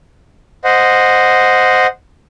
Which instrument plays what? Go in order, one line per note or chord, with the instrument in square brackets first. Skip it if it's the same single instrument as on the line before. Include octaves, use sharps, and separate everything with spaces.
[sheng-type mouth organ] C5 D#5 F#5